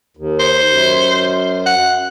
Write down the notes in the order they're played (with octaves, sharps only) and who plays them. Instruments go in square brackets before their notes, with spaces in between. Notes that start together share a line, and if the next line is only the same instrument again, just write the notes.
[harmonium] D#2
[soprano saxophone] C5
[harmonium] F#2
[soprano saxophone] F#5